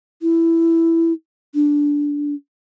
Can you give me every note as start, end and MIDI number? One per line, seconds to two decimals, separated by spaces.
0.22 1.13 64
1.55 2.34 62